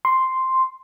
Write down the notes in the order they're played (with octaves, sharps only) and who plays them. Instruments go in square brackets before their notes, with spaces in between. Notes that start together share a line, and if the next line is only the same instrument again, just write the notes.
[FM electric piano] C6